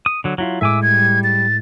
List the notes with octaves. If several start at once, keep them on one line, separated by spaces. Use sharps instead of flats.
D#6 D7
D3 F#3
F#3 E4 F4
A2 G#3 E5 G#5 D6 E6
G3 G#6
A6